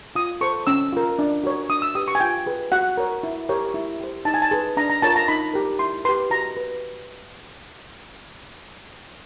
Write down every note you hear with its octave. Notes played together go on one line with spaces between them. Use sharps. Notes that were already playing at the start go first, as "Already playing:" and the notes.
F4 D#6
A4 C5 C#6
C#4 E6
F4 A#4
D4
F#4 A#4 C#5
D4 D#6
E6
G4 B4 D#6
C#6
G#5
F4 G5
G#4 B4
F#4 F#5
A#4 C#5
E4
G4 A#4 C#5
E4
G4 C5
D#4 A5
G#5
A5
G#4 B4
D4 A#5
A#5
F4 A#4 C#5 A5
A#5
D#4 B5
G4 A#4
E4 C6
G4 B4 C6
F#4 A#5
B4